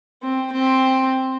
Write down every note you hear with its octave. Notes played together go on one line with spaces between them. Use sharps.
C4
C4